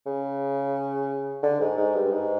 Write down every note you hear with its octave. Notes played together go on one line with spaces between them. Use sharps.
C#3
D3
G#2
G#2
G2
G#2